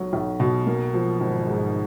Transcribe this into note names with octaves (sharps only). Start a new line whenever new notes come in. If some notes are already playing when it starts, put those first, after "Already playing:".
Already playing: B1 F#3
B1
B2
A#3
F3
G#1
G#2